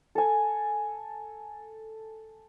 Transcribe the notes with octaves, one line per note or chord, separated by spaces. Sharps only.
A4 G#5